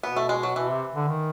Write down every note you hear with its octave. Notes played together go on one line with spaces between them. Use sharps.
B2 B3
A3
G#3
F#3
B2 E3
C3
D3
D#3